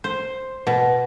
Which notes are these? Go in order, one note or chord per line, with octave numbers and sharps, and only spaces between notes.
C5
B2